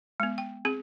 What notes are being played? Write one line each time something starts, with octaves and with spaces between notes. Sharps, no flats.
G#3 B3
G5
C4 G#4